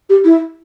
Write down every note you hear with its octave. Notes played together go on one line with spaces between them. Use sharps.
G4
E4